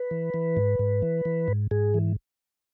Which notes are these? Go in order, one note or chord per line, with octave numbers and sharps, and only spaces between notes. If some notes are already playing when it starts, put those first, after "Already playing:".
Already playing: B4
E3
E3
G#2
G#2
E3
E3
G#2
G#2 G#4
E3